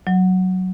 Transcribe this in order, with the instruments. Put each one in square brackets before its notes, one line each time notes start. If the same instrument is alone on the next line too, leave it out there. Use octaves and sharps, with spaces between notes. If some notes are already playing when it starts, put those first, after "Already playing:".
[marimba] F#3